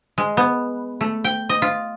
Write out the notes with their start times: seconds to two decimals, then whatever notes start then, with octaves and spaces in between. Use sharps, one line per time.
0.18 G#3
0.37 B3
1.01 A3
1.24 G5
1.49 D#5
1.62 F4